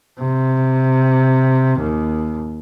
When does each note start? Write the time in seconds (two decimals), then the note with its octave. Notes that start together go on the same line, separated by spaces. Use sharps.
0.20 C3
1.81 D#2